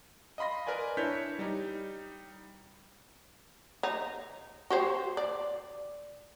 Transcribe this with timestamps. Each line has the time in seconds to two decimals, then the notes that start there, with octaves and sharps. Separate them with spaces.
0.38 D#5 F5 B5 C6 A#6
0.67 A#4 B4 D5 G#5
0.97 D4 E4 C#5 G6 B6
1.39 G3 D#4
3.83 D#4
4.70 F#4 G4 C5
5.17 D5